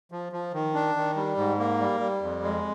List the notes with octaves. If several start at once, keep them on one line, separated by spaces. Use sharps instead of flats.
F3
F3
D#3
D4
D#3
G3
G#2
A#3
G3
G3
F2
G#3